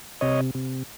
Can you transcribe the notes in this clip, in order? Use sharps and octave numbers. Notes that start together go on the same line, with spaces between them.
C3 C#5 D#5
C3